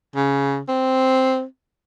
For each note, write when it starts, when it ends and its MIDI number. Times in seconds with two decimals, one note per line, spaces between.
0.16 0.60 49
0.69 1.44 60